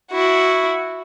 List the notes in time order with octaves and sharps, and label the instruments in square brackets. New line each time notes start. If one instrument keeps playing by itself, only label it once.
[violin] E4 F#4